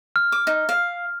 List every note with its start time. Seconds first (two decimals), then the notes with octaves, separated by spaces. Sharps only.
0.16 F6
0.32 D6
0.47 D#4
0.69 F5